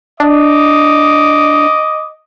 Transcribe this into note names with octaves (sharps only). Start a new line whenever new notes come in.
D4 D#5 D6